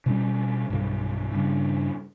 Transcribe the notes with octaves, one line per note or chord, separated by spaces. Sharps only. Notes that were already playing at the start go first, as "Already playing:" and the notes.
B2 G3 C#4
B1 G2
G2 C#3